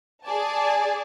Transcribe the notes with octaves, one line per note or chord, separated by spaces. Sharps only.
G#4 D5 G#5 A5